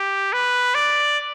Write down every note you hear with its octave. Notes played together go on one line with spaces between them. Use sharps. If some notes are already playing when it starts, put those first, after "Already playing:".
Already playing: G4
B4
D5